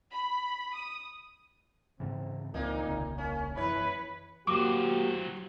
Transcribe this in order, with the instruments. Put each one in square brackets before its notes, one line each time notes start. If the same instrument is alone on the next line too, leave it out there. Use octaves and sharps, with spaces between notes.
[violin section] B5
D#6
[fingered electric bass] G#2 C#3 E3 [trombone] C4
[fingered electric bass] C#2 D#3 C4 [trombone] A#2 [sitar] A#3 D#4
[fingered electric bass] D#1 C2 C#3
[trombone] A#3 [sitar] C#4
[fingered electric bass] F#2 E3 [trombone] E4 [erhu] B4 [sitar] C#5
[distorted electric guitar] F#3 C5 [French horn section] A#3 F#4 G4 [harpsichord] D6